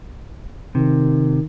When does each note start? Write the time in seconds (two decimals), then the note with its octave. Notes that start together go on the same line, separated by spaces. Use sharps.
0.75 C3 D#3